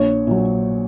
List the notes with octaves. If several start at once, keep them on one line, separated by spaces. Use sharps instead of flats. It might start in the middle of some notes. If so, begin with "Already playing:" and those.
Already playing: A#1 C#5
A#2 F#3